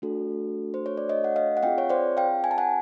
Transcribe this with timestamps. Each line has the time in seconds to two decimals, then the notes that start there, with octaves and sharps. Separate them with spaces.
0.02 A3 D4 F#4 A4
0.74 C5
0.86 C#5
0.98 D5
1.09 C#5 D#5
1.24 F#5
1.36 D#5 F5
1.57 F#5
1.63 C4 F4 G#4 F5 G5
1.78 C#5
1.90 C5 D5
2.17 F5 G5
2.44 G#5
2.51 A5
2.58 F#5 G#5